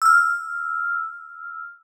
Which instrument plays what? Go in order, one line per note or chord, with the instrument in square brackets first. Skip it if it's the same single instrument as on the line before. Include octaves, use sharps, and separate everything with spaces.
[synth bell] E6 F6